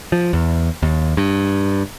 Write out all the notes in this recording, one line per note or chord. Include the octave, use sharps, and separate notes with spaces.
F3
E2
D#2
G2